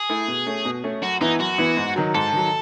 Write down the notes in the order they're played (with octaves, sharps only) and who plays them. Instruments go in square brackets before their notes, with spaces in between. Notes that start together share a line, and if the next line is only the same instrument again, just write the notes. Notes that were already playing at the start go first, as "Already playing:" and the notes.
Already playing: [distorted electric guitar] G#4
[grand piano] A3 E4
B2
A3 C#4
B2
A3 C#4
[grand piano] F#2 [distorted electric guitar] F#4
[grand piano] E3 B3 E4 [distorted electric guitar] D#4
[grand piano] F#2 [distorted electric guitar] F#4
[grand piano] E3 B3 E4
G#2
D#3 F#3
[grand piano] G#2 [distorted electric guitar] A4
[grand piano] D#3 F#3